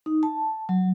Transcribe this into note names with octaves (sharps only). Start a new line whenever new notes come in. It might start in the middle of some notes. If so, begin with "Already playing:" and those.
D#4
A5
F#3